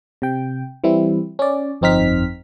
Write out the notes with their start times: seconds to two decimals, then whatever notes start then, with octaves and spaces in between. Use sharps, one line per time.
0.22 C3 G5
0.84 E3 G3 C4 E4
1.39 C#4 D5
1.81 G1 F2 C4 D#4 F6 B6